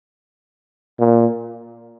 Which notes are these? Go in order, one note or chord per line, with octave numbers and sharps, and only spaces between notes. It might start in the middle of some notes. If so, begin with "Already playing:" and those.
A#2